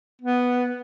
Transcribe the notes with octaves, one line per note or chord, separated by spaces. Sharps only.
B3